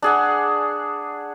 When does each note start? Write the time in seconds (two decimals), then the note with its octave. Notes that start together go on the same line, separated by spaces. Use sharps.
0.02 D4 G#4 F#5